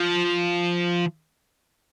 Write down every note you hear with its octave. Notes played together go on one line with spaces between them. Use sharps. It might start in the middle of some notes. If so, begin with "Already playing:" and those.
Already playing: F3